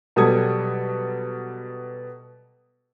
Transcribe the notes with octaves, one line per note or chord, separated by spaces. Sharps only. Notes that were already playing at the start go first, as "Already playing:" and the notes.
B2 F#3 G3 A4 D#6 G#6